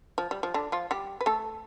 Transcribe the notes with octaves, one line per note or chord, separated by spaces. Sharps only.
F3
G3
F3
D3 D4
F3 F4
G3 G4
B4
A3 A4